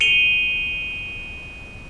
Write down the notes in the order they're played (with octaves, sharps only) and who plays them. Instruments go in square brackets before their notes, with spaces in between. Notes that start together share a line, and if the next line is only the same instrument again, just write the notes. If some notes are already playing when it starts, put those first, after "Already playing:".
[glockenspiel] C#7 D#7 F7 G7